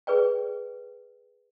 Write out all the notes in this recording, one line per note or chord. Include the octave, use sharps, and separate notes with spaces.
G#4 B4 D5 G5